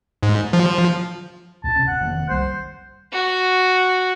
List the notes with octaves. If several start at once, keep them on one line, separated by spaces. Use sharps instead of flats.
G#2
F3
D2 A#2 A5
C3 C#4
F#1 F#5
F1 D#3 A#3
F#1 C2 G3 C5
F#4